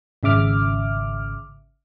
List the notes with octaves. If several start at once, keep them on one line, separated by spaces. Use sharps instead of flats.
G#1 C#3 E5 D6 F6